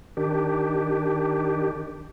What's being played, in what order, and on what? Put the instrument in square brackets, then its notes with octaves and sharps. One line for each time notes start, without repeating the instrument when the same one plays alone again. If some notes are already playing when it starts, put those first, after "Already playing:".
[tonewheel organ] D#3 D4 G4